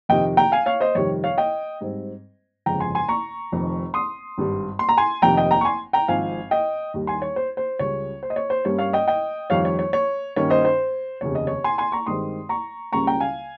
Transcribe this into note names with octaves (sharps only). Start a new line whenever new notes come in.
F2 C3 D#3 D#5 G5
G5 A#5
F5 G#5
C#5 F5
C5 D#5
F2 C3 D#3 G3 C#5
C#5 F5
D#5 G5
G#2 G3 C4
G1 F2 C#3 G#3 G5 A#5
G#5 C6
G#5 C6
A#5 C#6
F1 F2 D#3
C6 D#6
G#1 G2 G3
C6
A#5
G#5 C6
F1 F2 C3 D#3 G5 A#5
D#5 G5
G5 A#5
C#6
G#5 C6
G5 A#5
G#1 G#2 F3 C4 F5 G#5
D#5 G5
D#2 D#3 G3
G#5 C6
C#5
C5
C5
C#2 C#3 G3 C#5
C5
D#5
C#5
C5
G2 G3 A#3 C#4 C#5
C#5 F5
D#5 G5
D#5 G5
F2 D#3 G3 C#5 F5
C#5
C#5
C#5
G2 D#3 A#3 C#4 C#5
C5 D#5
C5
F1 D#2 C#3 C#5
D#5
C#5
G#5 C6
G#5 C6
A#5 C#6
G2 D#3 G#3 C4 C6 D#6
A#5 C#6
C#2 C#3 G3 A#3 C#4 A#5 C#6
G5 A#5
F5 G#5